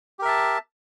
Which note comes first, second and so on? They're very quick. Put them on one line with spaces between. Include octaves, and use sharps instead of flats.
G4 A#4 E5 A5